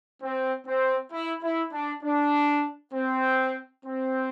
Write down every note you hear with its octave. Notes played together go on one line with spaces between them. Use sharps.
C4
C4
E4
E4
D4
D4
C4
C4